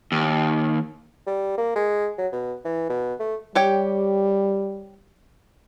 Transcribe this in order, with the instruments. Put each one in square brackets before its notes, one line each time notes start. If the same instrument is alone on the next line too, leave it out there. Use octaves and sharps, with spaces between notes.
[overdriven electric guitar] D#2
[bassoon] G3
A#3
G#3
F#3
B2
E3
B2
A3
[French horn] G3 [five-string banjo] G4 C#5 G5